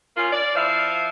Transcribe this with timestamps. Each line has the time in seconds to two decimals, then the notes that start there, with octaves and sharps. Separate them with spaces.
0.15 A#3 C#4 F4
0.33 D5
0.55 F3 E4 F5